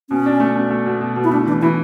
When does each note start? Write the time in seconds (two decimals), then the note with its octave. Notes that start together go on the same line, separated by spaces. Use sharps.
0.10 B2 C#4
0.26 D4
0.40 A3
0.55 B2
0.70 A3
0.86 B2
1.01 B2
1.16 B2
1.24 E4
1.31 A3 D4
1.47 E3 D4
1.62 E3 E4